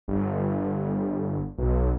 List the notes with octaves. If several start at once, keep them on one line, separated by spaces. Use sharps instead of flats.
G1
B1